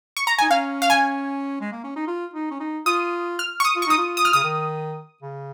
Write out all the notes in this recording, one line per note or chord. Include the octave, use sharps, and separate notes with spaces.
C#6
A#5
D#4 G#5
C#4 F5
F5
G#5
G#3
A#3
C#4
D#4
F4
D#4
C#4
D#4
F4 D#6
F6
C#6
D#6
F4
C#6
D#4 D#6
F4
D#6
F6
C#3 D#6
D#3
C#3